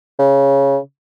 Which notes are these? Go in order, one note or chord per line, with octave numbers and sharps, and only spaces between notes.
C#3